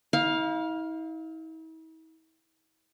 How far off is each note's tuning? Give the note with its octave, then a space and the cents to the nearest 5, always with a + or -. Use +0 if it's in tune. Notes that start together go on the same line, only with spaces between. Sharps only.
E4 -45 F5 +5